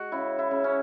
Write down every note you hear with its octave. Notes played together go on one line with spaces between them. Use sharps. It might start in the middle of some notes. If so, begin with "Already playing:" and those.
Already playing: G#3 F#4
C#3 E4
E4
C#3
C#4